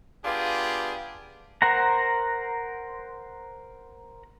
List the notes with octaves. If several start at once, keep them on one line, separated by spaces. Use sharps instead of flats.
B3 D4 F4 G4 G#4
A#4 C5 F#5 A#5